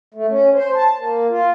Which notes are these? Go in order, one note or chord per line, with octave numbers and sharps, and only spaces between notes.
A3
C#4
C5
A5
A#3
F4